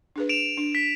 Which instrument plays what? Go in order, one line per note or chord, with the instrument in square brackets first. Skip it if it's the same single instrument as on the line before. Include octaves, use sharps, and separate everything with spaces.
[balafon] D4 G#4 B4
[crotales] D7 E7 F7
[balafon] D4
[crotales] B6